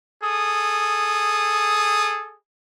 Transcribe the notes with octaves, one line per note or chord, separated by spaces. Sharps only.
G#4 A4 D#6